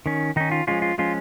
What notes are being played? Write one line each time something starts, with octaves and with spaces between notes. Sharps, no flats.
D#3 C#4
D#3 C#4 D#4
F4
F3 G#3 C#4 F4
F4
F3 G#3 C#4 F4